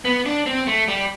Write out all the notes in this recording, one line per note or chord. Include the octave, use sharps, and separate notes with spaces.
B3
D4
C4
A3
G3